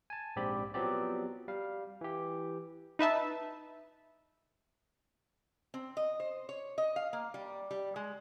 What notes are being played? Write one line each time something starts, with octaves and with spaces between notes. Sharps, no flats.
G#5 A5
A#1 G#2 C4 G4 D5 B5
F3 F#3 B3 C4 G4 D5
G3 F5
E3 G4
D#4 B4 E5 A5
C4
D#5
C5
C#5
D#5
F5
A#3
G3
G3
G#3